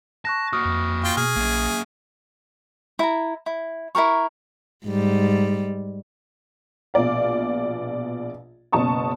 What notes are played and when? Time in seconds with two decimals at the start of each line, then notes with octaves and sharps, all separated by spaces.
0.25 A5 C#6 F#6 A#6
0.53 A#3 F#4 C#6 D#6 F6
0.65 F2
1.04 F4 G5
1.17 B2 G#4 F6
1.36 A#1 F#3 A#3
2.99 E4 A#5
3.46 E4
3.95 E4 A4 A#4 C#6
4.86 G#2 G3
6.94 A#1 B2 D5 F5
8.72 F#1 B2 A5 C#6 D#6